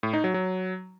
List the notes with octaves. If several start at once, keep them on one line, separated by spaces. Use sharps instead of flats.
A2
D#4
F#3
F#3